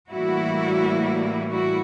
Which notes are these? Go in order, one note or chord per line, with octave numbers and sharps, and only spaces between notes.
A2 E3 G3 A#3 E4 F#4
E4 F#4